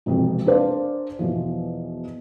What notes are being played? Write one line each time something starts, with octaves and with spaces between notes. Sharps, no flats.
E1 F2 C3
D4 G#4 A#4 C5 D5 F5
E2 B2 E3 F3